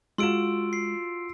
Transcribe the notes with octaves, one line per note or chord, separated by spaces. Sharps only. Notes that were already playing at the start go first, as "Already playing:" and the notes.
G#3 F4 F#4 C6 E6 D7 E7
C7